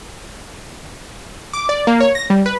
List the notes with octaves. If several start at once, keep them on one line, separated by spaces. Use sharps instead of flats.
D6
D5
A#3
C#5
A#6
G3
B4